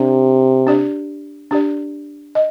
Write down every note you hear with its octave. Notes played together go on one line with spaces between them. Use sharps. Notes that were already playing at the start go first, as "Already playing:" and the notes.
Already playing: C3 D4 G4 D5
D4 G4 D5
D4 G4 D5
D#5